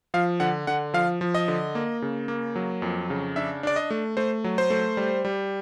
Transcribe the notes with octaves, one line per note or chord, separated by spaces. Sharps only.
F3 F5
D3 F#5
D3 F#5
F3 F5
F3
D#5
D3
A#3
C#3
A#3
F#3
F2
C#3
D4 E5
D4 D5
D#5
A3
A3 C5
F#3
C5
A3
G3
G3